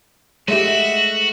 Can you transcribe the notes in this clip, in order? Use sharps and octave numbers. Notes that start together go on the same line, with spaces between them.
G#3 A3 F#4 G4 E5